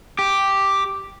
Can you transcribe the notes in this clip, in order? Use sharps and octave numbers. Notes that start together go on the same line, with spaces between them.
G4